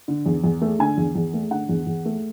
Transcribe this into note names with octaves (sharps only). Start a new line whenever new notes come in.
D3
E2
E2
A3
D3 G#5
E2
E2
A3
D3 F#5
E2
E2
A3